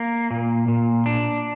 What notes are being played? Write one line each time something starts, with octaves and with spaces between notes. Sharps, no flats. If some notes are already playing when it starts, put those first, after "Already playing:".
Already playing: A#3
A#2
A#2
D4